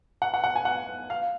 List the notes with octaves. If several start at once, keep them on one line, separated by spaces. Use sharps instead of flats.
F#5
F#5
F#5
G#5
F#5
F5